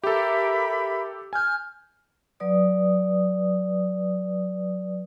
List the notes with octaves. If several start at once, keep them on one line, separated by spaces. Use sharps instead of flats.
G4 A4 A#4 E5 B5
G#5 F6 G6
F#3 B4 D5 D#6